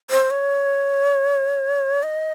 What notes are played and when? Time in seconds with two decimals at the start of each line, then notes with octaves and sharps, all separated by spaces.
0.10 C5
0.30 C#5
2.03 D#5